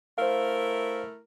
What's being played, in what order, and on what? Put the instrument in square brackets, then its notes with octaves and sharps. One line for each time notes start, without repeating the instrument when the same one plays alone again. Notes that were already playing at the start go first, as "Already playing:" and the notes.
[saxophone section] A3 E4 A#4 [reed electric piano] C5 F5